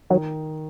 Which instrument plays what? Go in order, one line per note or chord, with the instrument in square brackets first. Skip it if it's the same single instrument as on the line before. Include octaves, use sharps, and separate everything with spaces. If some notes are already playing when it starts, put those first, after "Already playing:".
[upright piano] D#3 [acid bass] F#3